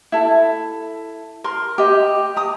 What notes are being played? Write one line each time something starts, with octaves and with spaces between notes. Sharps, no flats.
E4 A4
A#4 C6
G4 D#5
A#5 D#6